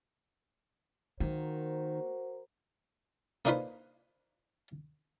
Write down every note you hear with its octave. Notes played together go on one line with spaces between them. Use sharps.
D#3 A#3 F#4 A#4 C5
A#3 D4 D#4 F4 B4 C5